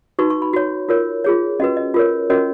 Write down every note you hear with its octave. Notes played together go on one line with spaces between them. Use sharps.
D#4 F#4 B4 C#6
C#6
B5
F#4 C#5
F4 A#4 C#5
F4 G#4 C#5
C#4 F#4 B4 D#5
D#5
F4 A#4 C#5
C#4 F#4 A#4 C#5 D#5